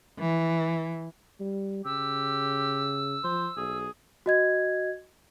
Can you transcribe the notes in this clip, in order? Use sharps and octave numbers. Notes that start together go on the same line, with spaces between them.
E3
G3
C#3 G4 E6
F3 C5
B1 G#4
F#4 D#5 G#6